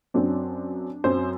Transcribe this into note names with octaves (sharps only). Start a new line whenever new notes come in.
F#2 F#3 C4 D4
F#2 F#3 C4 C5